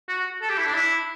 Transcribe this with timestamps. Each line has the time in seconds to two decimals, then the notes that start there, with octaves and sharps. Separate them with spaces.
0.08 F#4
0.42 A4
0.49 G4
0.57 E4
0.66 D4
0.74 E4